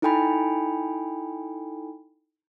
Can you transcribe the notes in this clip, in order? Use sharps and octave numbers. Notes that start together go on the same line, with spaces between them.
D#4 E4 A4 G5 G#5 B5